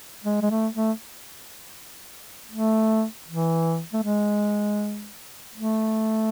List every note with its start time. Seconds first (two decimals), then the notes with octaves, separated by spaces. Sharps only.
0.24 G#3
0.42 G#3
0.50 A3
0.74 A3
2.51 A3
3.28 E3
3.93 A3
4.03 G#3
5.55 A3